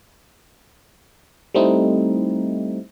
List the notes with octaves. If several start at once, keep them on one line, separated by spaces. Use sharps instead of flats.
G3 A3 C4 D#4 E4